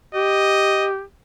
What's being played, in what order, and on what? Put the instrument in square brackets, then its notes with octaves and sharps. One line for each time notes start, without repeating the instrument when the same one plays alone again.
[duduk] G4 [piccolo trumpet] D#5